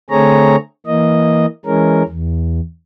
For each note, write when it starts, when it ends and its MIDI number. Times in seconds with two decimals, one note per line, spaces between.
0.10 0.56 50
0.10 0.56 57
0.10 0.56 60
0.10 0.56 68
0.10 0.56 73
0.10 0.56 82
0.86 1.46 52
0.86 1.46 58
0.86 1.46 75
1.66 2.03 52
1.66 2.03 56
1.66 2.03 61
1.66 2.03 70
2.08 2.60 40